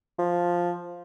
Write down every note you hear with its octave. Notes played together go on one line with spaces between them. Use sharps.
F3